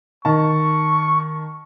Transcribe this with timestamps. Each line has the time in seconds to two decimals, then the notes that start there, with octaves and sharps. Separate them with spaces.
0.25 D#3 A5 C#6